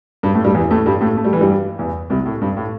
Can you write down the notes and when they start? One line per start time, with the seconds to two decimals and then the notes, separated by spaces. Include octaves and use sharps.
0.23 G2 G3
0.34 A2 A3
0.44 G2 G3
0.54 E2 E3
0.71 A2 A3
0.86 G2 G3
1.01 A2 A3
1.17 A3
1.24 G3
1.33 E3
1.41 G2 G3
1.79 E2 E3
2.10 C2 C3
2.26 A2
2.41 G2
2.57 A2